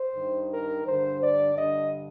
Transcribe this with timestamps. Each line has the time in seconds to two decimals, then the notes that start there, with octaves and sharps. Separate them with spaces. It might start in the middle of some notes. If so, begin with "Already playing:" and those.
Already playing: C5
0.15 G2 D#3
0.50 A#4
0.85 G2 D3 C5
1.20 D5
1.55 G2 D3 D#5